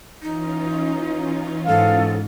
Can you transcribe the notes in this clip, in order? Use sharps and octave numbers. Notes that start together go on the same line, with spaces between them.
E3 C#4 D#4 F4
G#2 A4 F5